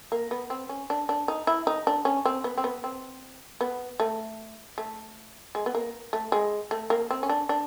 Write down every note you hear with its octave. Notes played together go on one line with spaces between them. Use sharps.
A#3
B3
C4
C#4
D4
D4
D#4
E4
D#4
D4
C#4
C4
B3
C4
B3
C4
B3
A3
A3
G#3
B3
A#3
A3
G#3
A3
A#3
C4
C#4
D4
D4